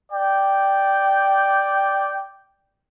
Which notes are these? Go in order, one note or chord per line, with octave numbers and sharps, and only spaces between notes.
D5 G5